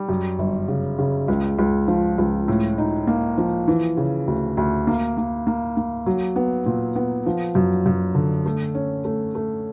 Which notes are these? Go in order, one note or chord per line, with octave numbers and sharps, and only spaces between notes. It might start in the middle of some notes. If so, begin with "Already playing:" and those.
Already playing: G3
F#2
G1
C#3
C#3
C#2
C#2
F3
C#2
A2
D#4
A#3
F3
E3
C#3
D2
D2
A#3
A#3
A#3
A#3
F#3
B3
A#2
B3
F3
F#2
F#2
D3
A3
C#4
A3
A3